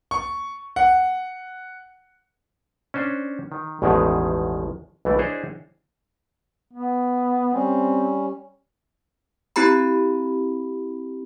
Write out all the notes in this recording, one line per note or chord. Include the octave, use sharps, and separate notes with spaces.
C#6
F#5
C#4 D4 C5
D#3
A1 E2 B2 D#3 F3 G#3
B1 E3 A3
D4 E4 G#4 C5 C#5 D#5
B3
G3 C4 C#4
C4 E4 G4 A#5 B5